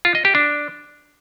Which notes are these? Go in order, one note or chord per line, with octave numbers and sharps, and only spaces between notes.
F4
D#5
G4
D4